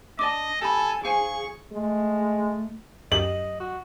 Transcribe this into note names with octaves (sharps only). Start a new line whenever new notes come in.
D4 D5 D#5 A5 D6
G4 A4 G#5 B5
G#4 C5 F5 G#5 C#6
G#3 A3
F#2 G4 D#5 F#7
F#4